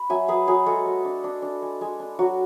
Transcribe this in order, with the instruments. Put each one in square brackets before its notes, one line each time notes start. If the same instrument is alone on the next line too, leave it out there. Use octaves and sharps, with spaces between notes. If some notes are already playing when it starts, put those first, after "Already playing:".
Already playing: [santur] B5
F#3 E5 G#5
F#3 G#4 B4
F#3 G#4 B4
G#3 F#4 A4
G#3
D4
D4
D4
G#3
G#3
D4
F#3 F#4